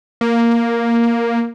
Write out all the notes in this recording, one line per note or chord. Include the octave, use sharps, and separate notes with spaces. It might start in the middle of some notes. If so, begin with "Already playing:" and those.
A#3